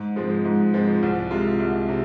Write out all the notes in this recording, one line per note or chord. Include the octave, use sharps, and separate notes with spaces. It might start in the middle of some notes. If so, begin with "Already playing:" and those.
Already playing: G#2
F3 G#3 C4
G#2
F3 G#3 C4
C2
C3 G#3 F4
C2
C3